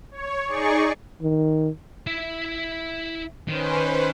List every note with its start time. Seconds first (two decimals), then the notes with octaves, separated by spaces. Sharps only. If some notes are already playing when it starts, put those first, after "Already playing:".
0.11 C#5
0.44 D#4 G#4 D5 C#6
1.22 D#3
2.07 E4 E5
3.48 D#3 C#4 B4 C5